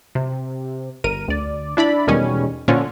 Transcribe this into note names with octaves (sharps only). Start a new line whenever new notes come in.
C3
G1 A#4 D#7
D2 D5
D4 E4 D5 B5
E2 B2 D#3 G3 G#3 C#4
A#2 D3 F3 C#4 F4